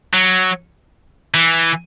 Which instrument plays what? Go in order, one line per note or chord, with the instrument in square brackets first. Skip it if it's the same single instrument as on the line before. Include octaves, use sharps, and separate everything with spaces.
[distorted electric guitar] F#3
E3